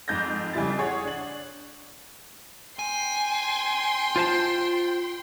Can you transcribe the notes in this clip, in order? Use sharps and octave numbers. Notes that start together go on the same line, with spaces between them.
F2 G#2 G6 A6 A#6
F2 C#3 G3 E4 A6
G#4 C#5 F#5
D4 F#7
G5 G#5 C6
F4 C5 A5